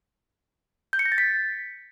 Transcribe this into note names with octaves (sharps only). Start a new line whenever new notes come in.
G6
C#7
A#6
A6
B6